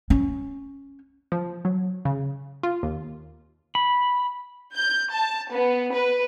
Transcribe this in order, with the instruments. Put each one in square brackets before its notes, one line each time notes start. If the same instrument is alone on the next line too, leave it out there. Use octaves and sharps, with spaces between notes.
[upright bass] C#4
[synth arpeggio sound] F3
F#3
C#3
F4
D#2
[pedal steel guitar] B5
[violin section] G6
A5
B3
B4